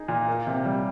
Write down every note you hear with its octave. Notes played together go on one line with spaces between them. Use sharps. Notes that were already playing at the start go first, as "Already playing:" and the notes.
Already playing: D#4 G#4
A#2
A#3
C3
G3